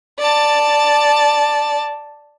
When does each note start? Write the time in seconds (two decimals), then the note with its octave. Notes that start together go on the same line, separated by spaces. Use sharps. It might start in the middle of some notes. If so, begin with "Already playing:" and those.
0.19 D5 A5